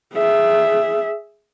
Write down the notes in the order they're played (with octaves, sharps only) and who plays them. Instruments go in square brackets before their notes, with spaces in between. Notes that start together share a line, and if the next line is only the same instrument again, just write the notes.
[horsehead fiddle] G#4 E5